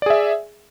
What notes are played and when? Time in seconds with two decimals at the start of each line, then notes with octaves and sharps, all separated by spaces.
0.02 D5
0.06 G#4
0.10 E5